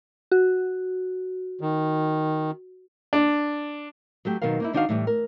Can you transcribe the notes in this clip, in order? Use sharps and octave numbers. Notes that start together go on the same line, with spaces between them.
F#4
D#3
D4
F#3 A3 G4
B2 D#3 F#3 A#4 F5
A#3 D#4 E4
D#3 D4 D#4 F#4 D#5 F5
A2 E3 G3
A#4